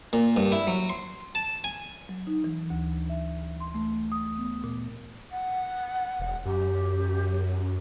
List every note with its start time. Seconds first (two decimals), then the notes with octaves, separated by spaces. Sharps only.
0.13 A#2
0.36 G2
0.52 E4
0.67 F#3
0.90 C6
1.35 A5
1.64 G#5
2.09 F#3
2.27 D#4
2.44 E3
2.70 D2
3.10 E5
3.61 C6
3.75 A3
4.12 D#6
4.38 B3
4.64 A#2
5.32 F#5
6.20 E1
6.46 F#2 G4